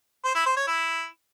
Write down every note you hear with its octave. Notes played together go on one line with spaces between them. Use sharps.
C5
E4
C5
C#5
E4